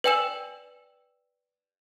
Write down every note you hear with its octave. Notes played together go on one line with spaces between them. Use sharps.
B4 D5 G5 G#5 E6 E7